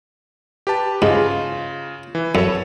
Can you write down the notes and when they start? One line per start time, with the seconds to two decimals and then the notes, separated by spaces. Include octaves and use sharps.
0.67 G4 B4 A5
1.02 G#2 C#3 F4
2.15 E3
2.35 F#2 A4 C#5